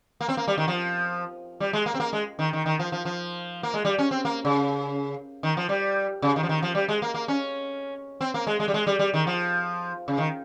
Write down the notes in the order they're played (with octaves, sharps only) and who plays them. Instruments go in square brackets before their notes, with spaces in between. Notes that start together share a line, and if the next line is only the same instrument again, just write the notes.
[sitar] A#3
C4
A#3
G3
D#3
F3
G3
G#3
A#3
C4
A#3
G#3
D#3
D#3
D#3
F3
F3
F3
A#3
G#3
G3
C#4
C4
A#3
C#3
D#3
F3
G3
C#3
D#3
F3
D#3
F3
G3
G#3
A#3
A#3
C#4
C4
A#3
G#3
G#3
G3
G#3
G3
G3
D#3
F3
C#3
D#3